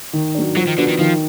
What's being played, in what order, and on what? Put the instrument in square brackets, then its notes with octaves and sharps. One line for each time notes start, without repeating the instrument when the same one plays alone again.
[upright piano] D#3
F#3 D4
[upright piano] F3 [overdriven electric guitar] F#3
[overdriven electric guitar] D#3
[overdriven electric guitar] D3 [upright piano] B3 D4 F#4
[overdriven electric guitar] D#3
[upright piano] D#3 [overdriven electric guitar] F3